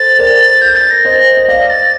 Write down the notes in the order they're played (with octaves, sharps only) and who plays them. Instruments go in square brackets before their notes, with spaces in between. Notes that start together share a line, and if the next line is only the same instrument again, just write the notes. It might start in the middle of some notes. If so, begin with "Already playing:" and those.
Already playing: [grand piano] A4 C5 [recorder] A6
[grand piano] A#4 D5
[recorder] G6
A6
A#6
[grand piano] C5 D#5
D#5
[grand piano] D5 F5 [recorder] A#6
[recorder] A6